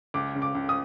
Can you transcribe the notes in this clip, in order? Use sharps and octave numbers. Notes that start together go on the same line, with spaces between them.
C#2 D6
C#3
D6
C#2
D#6